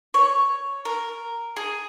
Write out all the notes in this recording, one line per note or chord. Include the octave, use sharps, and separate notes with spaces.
C#5
A#4
G#4